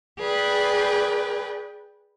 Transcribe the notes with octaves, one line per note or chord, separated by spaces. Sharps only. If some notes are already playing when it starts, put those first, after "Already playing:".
G#4 B4 D5 G5